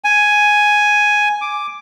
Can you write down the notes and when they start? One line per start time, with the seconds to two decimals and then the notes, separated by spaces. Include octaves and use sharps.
0.04 G#5
1.42 D6